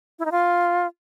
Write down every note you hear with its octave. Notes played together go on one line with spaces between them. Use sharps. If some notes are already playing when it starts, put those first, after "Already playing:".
E4
D#4
F4